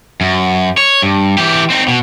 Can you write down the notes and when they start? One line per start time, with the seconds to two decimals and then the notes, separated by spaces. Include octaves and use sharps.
0.21 F#2
0.78 C#5
1.02 G2
1.38 E3 G4
1.70 C4 D#4
1.88 B2